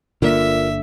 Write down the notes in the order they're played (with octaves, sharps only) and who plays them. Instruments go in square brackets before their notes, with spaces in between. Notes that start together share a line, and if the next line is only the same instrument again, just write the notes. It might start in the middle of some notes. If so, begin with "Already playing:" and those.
[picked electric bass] G1 A#3 [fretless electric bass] D3 [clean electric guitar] F4 A#4 D5 [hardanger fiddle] E5